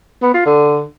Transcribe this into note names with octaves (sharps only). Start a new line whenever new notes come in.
B3
F4
D3